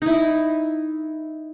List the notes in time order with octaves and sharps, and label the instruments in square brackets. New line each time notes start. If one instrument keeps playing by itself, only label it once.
[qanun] D#4 E4